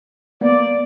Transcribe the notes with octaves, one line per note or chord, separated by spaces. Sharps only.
A#3 B3 D5